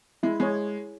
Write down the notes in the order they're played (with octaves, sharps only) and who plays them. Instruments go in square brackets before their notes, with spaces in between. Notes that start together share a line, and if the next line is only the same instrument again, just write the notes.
[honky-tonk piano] G#3 [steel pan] E4
[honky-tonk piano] G#3 [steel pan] G#4 C#5